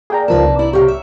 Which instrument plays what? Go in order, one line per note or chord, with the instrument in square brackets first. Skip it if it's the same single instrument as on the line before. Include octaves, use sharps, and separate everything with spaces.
[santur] A#3 D5 [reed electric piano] G#4 G5 A#5
[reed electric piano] C#2 F3 A#4 [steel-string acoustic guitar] D#4 B4 A5
[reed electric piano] C2
[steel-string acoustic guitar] E4 D5
[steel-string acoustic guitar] C3 D#3 G4 [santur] C#5 F5
[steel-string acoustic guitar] E5